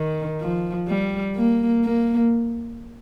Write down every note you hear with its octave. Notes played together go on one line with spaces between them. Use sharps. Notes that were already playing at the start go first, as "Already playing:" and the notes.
Already playing: D#3
F3
G3
A#3
A#3